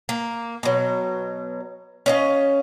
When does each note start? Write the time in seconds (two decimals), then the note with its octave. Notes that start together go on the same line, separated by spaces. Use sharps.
0.09 A#3
0.63 B2 F#3
2.06 C#4 D#5 F5